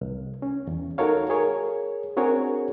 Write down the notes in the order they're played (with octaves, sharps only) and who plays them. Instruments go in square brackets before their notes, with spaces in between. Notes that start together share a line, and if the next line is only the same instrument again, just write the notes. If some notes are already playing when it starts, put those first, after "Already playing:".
[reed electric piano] C2
C#4
E2
D#4 F#4 A4 A#4 C#5 F5
G#4 A#4 C#5
C4 D4 F#4 G#4 A#4 C#5